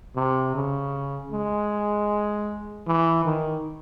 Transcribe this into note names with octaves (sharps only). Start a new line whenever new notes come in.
C3
C#3
G#3
E3
D#3